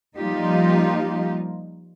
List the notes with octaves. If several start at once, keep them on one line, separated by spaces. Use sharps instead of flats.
F3 G3 A#3 D#4 F4 G4